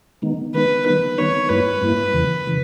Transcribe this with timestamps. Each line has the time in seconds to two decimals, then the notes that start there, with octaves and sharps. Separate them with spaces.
0.22 D#3 G#3 B3 D#4
0.54 D#3 G#3 B3 D#4 B4
0.86 D#3 G3 B3 D#4 B4
1.18 D#3 G3 B3 D#4 C#5
1.49 G2 G3 A#3 E4 B4
1.82 G2 G3 A#3 E4
2.13 E2 C#3 E3
2.47 C#3 E3